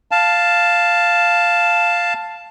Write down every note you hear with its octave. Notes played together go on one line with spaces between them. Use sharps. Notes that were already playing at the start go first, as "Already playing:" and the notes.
F5 A5